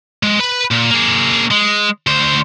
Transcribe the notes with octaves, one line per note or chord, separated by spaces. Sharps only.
G#3
B4 B5
A#2
A#3 G#4
G#3
D2 C5